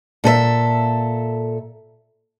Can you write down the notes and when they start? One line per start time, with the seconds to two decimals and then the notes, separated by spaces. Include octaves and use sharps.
0.24 A#2 A4 B4 E5